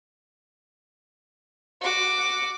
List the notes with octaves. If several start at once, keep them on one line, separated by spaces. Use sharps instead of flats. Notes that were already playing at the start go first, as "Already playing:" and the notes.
F#4 D6